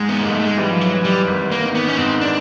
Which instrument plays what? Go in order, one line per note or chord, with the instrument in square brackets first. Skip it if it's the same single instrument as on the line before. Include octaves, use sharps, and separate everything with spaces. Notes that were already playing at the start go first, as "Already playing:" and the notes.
Already playing: [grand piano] G#2 [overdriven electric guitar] G#3
[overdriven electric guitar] B3
[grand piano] G#2 [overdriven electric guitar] A#3
[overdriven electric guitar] A3
G#3
[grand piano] E3 [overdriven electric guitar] G3
[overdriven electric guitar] F3
F#3
[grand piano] E3
[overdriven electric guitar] G3
[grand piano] G#1
[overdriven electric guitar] A#3
[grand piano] D#3
[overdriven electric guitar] B3
C#4
[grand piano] G#2 [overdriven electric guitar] C4
[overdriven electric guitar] D4